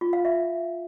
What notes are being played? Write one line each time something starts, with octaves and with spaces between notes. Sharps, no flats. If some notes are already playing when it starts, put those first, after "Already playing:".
F4
F5
E5